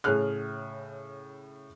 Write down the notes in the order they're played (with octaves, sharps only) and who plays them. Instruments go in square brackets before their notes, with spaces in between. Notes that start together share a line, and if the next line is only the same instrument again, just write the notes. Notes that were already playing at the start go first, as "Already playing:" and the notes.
[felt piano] A2 C#3 G#4 F6 F#6